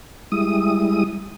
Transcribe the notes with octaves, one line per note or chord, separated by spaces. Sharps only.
G3 G#3 E4 D#6